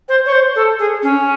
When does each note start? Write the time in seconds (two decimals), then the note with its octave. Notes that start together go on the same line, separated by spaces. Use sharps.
0.08 C5
0.26 C#5
0.31 C5
0.55 A4
0.79 G#4
1.02 C#4